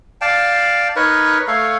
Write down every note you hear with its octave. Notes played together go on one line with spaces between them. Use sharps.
D5 F5 G5 A5
D#4 A#4 B4 C#5
A3 A4 C#5 F5